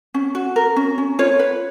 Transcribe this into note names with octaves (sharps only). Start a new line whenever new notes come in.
C#4
F#4
A#4
C#4
C#4
F4 C#5
B4